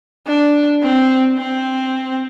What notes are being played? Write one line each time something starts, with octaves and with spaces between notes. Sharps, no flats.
D4
C4
C4